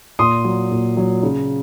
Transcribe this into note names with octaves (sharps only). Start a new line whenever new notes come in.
A#2 C6 D#6
F#3
A#2
F#3
C#3